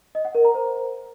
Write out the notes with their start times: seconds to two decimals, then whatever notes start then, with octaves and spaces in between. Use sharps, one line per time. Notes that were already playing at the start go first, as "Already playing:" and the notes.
0.15 D#5
0.25 F#5
0.35 A#4
0.45 A#5
0.54 C5